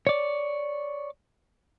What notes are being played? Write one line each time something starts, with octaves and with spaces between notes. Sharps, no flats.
C#5 D5